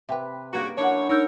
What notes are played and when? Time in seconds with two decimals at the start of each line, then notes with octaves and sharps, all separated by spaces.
0.09 C3 B4 E5 G5
0.53 G2 C#3 A#3 F#4 A#4
0.78 F#2 D4 E4 F#4 C#5
1.09 D#4 A#4 C#5 E6 G6